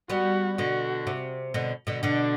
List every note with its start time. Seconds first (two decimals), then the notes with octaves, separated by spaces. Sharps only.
0.10 G3 B3 F#4
0.58 B2 D3 F#4
1.07 C3
1.54 B2 D3
1.87 B2 D3
2.03 B2 D3 D4